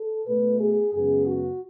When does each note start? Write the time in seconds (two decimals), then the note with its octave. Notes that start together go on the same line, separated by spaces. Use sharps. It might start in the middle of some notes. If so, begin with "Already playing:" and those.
Already playing: A4
0.26 B2 A3 B4
0.59 G#4
0.92 F#2 C#3 G#3 B3 G#4
1.26 F#4